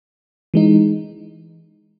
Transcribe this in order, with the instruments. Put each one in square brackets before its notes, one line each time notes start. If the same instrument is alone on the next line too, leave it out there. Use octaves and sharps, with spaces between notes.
[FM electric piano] E3 G#3 D#4